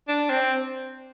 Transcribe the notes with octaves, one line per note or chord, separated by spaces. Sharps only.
D4
C4